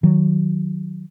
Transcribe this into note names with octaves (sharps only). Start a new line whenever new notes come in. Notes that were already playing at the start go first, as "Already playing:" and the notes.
D#3 F#3